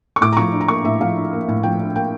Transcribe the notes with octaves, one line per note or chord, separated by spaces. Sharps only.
C#6
A2 D6
A#5
F3 C#6
D4
A#5
A#3 C#6
A2 E5
F3 F5
D4
A#3
A2
F3 G5
D4
A#3 G5